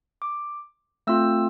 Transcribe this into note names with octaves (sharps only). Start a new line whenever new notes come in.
D6
A3 C4 F4 E6